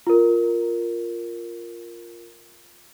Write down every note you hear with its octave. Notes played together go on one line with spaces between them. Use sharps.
F4 A#4